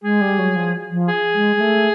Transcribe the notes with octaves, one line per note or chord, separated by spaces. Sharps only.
G#3 G#4
G3
F#3
F3
F3
G#4
G#3
G#3
A3